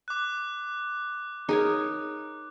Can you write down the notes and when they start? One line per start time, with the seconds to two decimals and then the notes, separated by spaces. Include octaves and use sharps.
0.08 D6 F#6
1.49 D#4 G#4 A#4 C#5 A#5